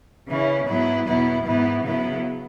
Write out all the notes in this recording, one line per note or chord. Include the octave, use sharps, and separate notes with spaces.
C#3 E3 C#4 E4
G#2 F#3 B3 E4
E2 B2 F#3 B3 E4
G#2 E3 B3 E4
C#3 F#3 B3 E4